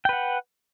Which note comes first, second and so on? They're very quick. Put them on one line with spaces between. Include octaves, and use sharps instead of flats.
G5 B4 F#5